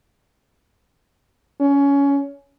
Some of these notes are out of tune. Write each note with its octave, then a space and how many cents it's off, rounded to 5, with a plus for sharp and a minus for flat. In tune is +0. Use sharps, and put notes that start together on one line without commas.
C#4 +20